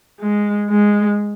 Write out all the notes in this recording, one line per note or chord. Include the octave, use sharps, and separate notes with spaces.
G#3
G#3